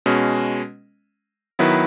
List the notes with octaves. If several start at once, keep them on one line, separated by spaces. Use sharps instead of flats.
B2 G#3 C#4
D#3 F#3 B3 E4 B4